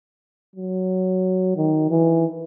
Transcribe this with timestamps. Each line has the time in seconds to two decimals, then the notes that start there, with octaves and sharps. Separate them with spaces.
0.56 F#3
1.57 D#3
1.90 E3